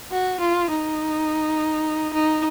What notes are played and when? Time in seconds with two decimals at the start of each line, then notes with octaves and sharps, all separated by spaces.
0.12 F#4
0.40 F4
0.70 D#4
2.13 D#4